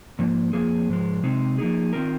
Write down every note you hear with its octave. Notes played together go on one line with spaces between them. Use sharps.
G#2 F3 A#3
F2 F3 A#3 G#4
G#2 F3 G#3
C3 G#3 C4 D#4
F3 A#3 D#4 G#4
D#3 C4 F4 A#4